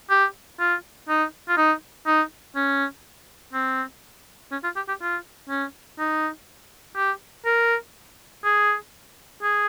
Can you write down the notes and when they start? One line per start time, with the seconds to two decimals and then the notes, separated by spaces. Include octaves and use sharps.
0.10 G4
0.60 F4
1.09 D#4
1.48 F4
1.57 D#4
2.07 D#4
2.55 C#4
3.53 C4
4.51 C#4
4.64 F4
4.76 G4
4.88 G4
5.01 F4
5.49 C#4
5.99 D#4
6.97 G4
7.46 A#4
8.44 G#4
9.43 G#4